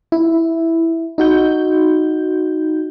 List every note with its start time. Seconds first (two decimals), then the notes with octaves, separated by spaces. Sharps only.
0.12 E4
1.18 D#4 F#4 G6